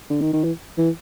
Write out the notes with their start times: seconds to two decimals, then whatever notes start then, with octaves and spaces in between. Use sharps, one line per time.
0.10 D3
0.21 D#3
0.33 D#3
0.44 E3
0.78 E3